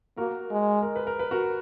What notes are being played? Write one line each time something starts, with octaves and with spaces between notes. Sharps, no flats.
A#3 F#4 A#4
G#3
A#4
B4
A#4
B4
F#4 A#4